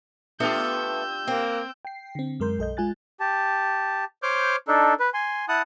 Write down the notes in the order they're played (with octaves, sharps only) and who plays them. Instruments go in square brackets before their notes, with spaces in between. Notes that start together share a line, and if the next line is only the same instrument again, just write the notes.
[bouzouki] A3 B3 A4 [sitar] D4 F4 G4 [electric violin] E6 G6
[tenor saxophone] A#3 [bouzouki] C4
[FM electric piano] G5 C7
D3 C4
F#2 G#3 A#4 C6 G6
B1 A4 D#5 G6
G#3 F4 G#5 F#6 A6
[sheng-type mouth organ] G4 A5
C5 C#5 D6 F6 G6
D4 D#4 A4
B4
G#5 C6
E4 F#5 A5 D#6 F#6